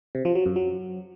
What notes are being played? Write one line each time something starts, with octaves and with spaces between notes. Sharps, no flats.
C3
F3
F#3
F#2
F#3